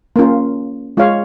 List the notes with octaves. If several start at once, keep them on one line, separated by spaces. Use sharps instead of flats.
A#3 C#4 F4
G#3 F4 C#5 F5